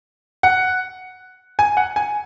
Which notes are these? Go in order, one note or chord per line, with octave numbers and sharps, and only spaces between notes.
F#5
G#5
F#5
G#5